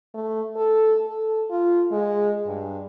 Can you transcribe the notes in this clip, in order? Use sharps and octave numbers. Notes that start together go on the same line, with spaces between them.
A3
A4
A4
F4
G#3
G2